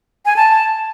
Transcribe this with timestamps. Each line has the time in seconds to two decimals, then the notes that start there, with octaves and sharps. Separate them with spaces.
0.26 G#5
0.36 A5